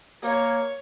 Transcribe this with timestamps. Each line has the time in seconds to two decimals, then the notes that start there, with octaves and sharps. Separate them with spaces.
0.24 A#3 C#5